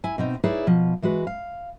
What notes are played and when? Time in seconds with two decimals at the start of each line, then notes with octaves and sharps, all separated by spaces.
0.04 E4 G#5
0.18 B2 C4 D#4
0.44 D#4 E4 G#4 B4 C#5 D5
0.67 B2 F3
1.02 E3 G#3 F#4 B4
1.27 F5